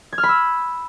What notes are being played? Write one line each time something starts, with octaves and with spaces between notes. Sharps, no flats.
G#6
F6
B5
E6